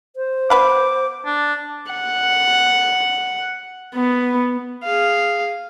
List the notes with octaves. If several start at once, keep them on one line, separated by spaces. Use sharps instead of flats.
C5
B3 B4 F#5 D6
D4
F#5
B3
G#4 F5